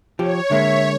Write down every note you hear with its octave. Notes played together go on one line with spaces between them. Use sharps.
F3 G4 C#5
D3 G#3 A#3 E5